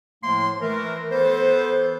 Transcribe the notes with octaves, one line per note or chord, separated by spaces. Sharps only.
A2 F3 A3 A#3 C6
E3 A3 A#4
E3 B3 A4 C5